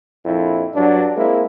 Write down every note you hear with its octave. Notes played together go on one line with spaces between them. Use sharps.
A#1 F2 E4
G2 F#3 D4
G#3 A#3 C4 E4